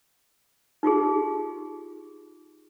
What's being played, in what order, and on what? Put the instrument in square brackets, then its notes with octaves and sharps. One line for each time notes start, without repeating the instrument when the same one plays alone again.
[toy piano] D#4 F4 G4 G#4